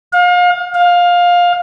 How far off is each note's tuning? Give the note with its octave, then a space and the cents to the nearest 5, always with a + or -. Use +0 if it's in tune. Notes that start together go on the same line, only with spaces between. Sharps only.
F5 +35
F5 +15